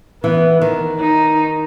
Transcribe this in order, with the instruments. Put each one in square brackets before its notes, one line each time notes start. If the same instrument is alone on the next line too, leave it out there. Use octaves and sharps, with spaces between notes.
[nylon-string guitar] E3 [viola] B3
[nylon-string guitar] D#3
[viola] D#4